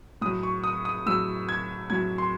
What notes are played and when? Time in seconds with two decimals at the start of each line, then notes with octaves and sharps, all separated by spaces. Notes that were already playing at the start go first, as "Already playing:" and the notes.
0.21 A2 D#6
0.26 F#3
0.43 C#6
0.64 D#6
0.85 D#6
1.06 A2 F#3 E6
1.49 G#6
1.90 A2 F#3 G#6
2.18 C6